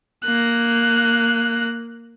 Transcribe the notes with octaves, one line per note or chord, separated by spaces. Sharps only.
A#3 F#6